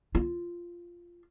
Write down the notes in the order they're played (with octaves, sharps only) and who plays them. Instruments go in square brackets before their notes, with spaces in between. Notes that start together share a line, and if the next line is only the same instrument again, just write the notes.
[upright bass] F4